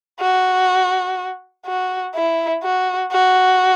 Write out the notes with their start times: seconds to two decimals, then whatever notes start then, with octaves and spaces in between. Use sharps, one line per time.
0.21 F#4
1.66 F#4
2.15 E4
2.63 F#4
3.12 F#4